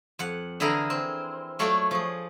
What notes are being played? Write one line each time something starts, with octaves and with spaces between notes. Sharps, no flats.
F2 F#5
D3 E3 E4 G#4 A#4 A#5
C4
F#3 A3 F4 C#5 D5 G5
F3 G#4